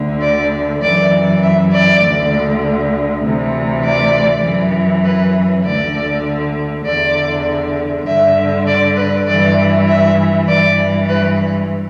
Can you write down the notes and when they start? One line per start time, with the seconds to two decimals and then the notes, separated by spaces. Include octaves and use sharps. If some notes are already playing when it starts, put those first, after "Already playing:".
Already playing: D2 D3
0.21 D5
0.82 F#2 E3 D5
1.43 E5
1.73 D5
2.02 D2 D3
3.23 D2 C3 E3
3.84 D5
4.44 F#2 E3
5.04 B4
5.64 D2 D3 D5
6.85 E2 D3 D5
8.06 G2 D3 E5
8.67 D5
8.96 B4
9.27 G2 E3 D5
9.87 E5
10.48 G2 E3 D5
11.08 B4